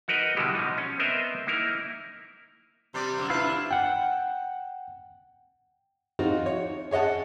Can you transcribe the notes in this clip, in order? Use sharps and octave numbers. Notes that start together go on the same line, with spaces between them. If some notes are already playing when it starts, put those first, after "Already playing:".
D#4 F#4 A#4 B4 D#5
B2 D3 G3 G#3 E4 G4
B2 F3 D#4
C#4
B3 C4 A#4 C5 D#5 E5
A#3 D#4 E4 A#4
C3 G3 D5
F#2 D3 A#3
A3 E4 F4 B4 F5
D4
F#5 G5
F3 C4 D#4 F4 F#4
C#5
G#4 C#5 D#5 F#5 A5